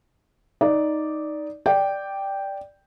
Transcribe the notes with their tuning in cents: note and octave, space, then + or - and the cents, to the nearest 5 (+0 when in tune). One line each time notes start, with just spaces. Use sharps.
D#4 +5 D5 -5
D5 +0 G5 +0